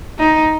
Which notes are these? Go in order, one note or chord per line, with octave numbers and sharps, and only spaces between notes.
D#4